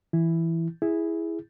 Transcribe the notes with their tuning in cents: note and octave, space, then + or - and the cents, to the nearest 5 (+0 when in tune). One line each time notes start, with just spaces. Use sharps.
E3 +0 E4 +5
E4 +0 G#4 -5